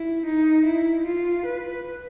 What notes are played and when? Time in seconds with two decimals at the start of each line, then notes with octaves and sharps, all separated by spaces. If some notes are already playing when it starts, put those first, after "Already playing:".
Already playing: E4
0.26 D#4
0.66 E4
1.06 F4
1.46 B4